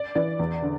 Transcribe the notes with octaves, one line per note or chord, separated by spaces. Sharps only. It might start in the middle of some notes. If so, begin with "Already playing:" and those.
Already playing: D5
E3 D5
E2
D3